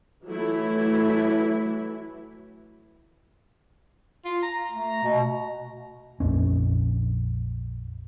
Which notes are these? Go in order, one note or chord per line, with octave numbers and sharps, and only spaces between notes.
E3 F#3 A3 E4
F4
A#5
A3
B2
A#1 F2 C#4